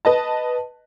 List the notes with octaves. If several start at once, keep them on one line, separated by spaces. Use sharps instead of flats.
B4 D#5 A5